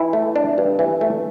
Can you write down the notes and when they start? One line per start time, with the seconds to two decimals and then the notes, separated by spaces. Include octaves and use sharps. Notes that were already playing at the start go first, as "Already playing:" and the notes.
Already playing: E3 E4
0.13 A3
0.36 D4
0.58 G2
0.79 E3
1.01 A3